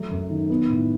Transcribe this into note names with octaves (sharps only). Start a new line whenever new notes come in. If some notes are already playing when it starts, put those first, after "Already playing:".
Already playing: F#3 A3
F#2
D#3
B3
A2